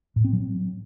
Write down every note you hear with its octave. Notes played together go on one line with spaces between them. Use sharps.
A2
C4
F#3